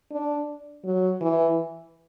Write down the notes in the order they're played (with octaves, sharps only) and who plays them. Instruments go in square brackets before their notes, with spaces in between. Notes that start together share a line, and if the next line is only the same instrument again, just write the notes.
[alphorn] D4
F#3
E3